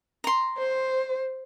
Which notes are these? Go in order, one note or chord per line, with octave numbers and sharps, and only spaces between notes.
A#5 C6
C5